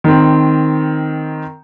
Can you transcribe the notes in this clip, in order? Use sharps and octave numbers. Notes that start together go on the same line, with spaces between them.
D#3 C4